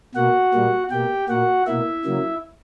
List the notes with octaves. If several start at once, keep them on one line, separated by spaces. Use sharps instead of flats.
B2 A#3 F#4 F#5
A#2 G3 A#3
B2 A#3 G4 G5
A#2 A#3 F#4 F#5
B2 A#3 E4 E5
C#3 F#3 A#3